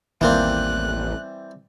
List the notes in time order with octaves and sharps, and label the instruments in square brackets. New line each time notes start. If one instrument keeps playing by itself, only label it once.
[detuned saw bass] A1 [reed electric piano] D#2 A#3 [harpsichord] E3 G3 C4 [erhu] F#6